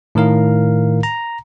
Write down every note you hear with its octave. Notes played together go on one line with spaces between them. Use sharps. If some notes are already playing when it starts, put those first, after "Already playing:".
A2 D#3 A#4 F5
A#5